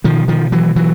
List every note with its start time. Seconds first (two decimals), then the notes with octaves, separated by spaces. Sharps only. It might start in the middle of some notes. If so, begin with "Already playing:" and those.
0.04 B2 D#3 F3
0.28 D#3 F3
0.52 E3 F#3
0.76 E3 F#3